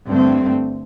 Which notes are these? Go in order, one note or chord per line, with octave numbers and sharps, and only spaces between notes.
G2 D3 A3 C4